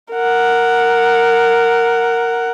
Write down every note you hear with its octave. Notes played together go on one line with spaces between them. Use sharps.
A#4 F#5